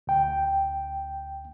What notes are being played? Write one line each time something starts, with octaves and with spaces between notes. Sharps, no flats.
D2 G5